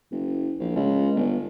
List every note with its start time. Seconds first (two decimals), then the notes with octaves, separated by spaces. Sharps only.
0.12 F#1
0.60 A#1
0.76 C#2
1.15 G1